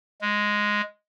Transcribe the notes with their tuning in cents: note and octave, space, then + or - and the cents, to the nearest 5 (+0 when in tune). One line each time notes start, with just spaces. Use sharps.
G#3 +0